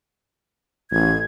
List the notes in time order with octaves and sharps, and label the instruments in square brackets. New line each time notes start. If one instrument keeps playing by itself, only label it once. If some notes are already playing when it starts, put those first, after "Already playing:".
[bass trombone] A1 [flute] G#6